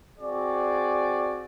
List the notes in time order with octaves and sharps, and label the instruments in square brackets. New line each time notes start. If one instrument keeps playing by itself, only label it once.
[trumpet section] C4 F#4 G#4 D5